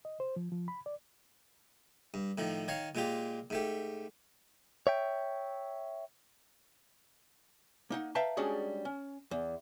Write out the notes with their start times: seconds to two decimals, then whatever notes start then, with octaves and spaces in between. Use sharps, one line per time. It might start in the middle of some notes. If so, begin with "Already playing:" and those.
0.05 D#5
0.20 C5
0.36 F3
0.52 F3
0.68 B5
0.86 D5
2.14 G2
2.38 A2 D#3 F3
2.68 D#3 C#5 F5
2.95 A#2 G#3 F4 G4
3.50 G#2 A3 G4
4.87 C#5 E5 G5
7.90 A#3 D#4 F#5
8.15 B4 E5 F5 G5 A5 A#5
8.37 G3 G#3 C#4 D4 F#4 G#4
8.85 C#4
9.31 E2